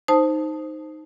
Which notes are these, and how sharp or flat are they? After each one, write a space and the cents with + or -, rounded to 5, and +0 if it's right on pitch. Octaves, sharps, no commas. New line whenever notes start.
D#4 +0 C5 +0 A5 +0